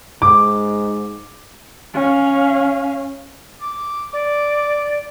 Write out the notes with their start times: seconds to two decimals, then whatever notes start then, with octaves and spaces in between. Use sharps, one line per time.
0.22 G#2 D6
1.94 C#4 F5
3.62 D6
4.13 D5 D6